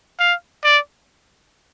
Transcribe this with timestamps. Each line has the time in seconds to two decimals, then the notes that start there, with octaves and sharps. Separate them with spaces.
0.20 F5
0.64 D5